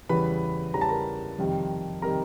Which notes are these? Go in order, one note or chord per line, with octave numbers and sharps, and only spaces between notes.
E2 C#3 E3 G3 B4 B5
E2 C#3 E3 G3 A#5
A5
A#4 A#5
F2 C3 D#3 G3 C4
C3 D#3 G3 C4 A#4 A#5